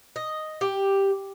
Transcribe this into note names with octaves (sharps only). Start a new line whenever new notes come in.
D#5
G4